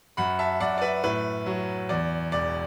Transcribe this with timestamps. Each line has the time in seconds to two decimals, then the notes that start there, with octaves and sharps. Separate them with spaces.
0.17 F#2 F#5 B5
0.39 E5 A5
0.60 F#2 D5 F#5
0.78 D5
0.81 B4 E5
1.03 A2 B4
1.46 F#3
1.89 E2 D5
2.32 E1 D5